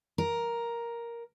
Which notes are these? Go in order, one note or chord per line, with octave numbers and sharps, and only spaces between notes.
A#4